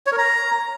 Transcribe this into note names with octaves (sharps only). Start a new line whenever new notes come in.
C#5
A#4
A#5